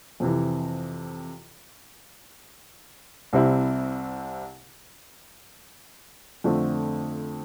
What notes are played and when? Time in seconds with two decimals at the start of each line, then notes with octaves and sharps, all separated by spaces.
0.20 F2 C3 E3
3.33 C2 C3 G3 C4 E4
6.44 F2 D3 A3 C4